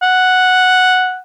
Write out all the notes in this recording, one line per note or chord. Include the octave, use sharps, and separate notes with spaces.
F#5